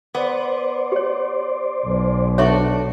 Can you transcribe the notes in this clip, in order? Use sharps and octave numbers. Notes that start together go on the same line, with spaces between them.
B3 C5 D5
G4 C#5
B1
D4 F#4 A4 C#5 E5 C#6